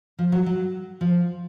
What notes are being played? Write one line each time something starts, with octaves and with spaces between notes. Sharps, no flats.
F3
F#3
F#3
F3